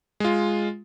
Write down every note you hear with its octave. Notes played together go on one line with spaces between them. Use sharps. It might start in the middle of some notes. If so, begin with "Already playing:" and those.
G#3 F4